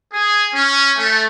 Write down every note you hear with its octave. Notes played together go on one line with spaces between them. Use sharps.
G#4
C#4
A3